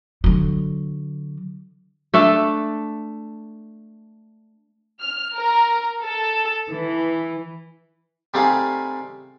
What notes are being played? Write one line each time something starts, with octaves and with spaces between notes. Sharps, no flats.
D3 F#3
A3 D4 A4
F6
A#4
A4
E3
C3 G3 A3 D#4 G#4 F5